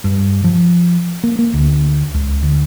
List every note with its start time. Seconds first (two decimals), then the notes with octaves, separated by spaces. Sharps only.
0.04 G2
0.44 F3
1.24 A#3
1.39 A#3
1.54 D2
2.14 C#2
2.43 D2